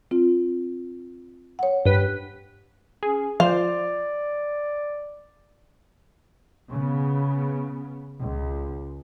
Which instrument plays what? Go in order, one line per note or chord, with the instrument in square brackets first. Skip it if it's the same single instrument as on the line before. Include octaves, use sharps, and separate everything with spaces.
[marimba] C4 F4
C#5 F#5
[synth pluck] G2 B4
[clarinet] C#4 [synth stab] G#4
[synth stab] F3 C5 [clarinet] D5 [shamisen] F5
[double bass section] C#3 B3
C#2